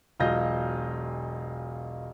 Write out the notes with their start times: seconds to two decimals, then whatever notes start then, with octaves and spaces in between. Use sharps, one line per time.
0.20 E1 B1 F4 D#5 G6 A#6